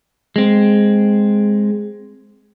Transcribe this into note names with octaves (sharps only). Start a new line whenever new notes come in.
G#3 C4